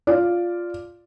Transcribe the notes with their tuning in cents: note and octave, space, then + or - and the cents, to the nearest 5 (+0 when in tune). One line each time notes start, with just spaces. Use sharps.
F4 +0 D5 +0